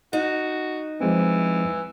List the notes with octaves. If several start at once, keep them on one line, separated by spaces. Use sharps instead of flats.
D#4 F#4
E3 F3 G#3 C4